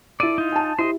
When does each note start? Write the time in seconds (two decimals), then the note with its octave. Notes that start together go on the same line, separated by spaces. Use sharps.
0.20 E4 A4 D5 D#7
0.38 D#4 F4
0.52 G#5 A5
0.79 E4 G4 C5 D#5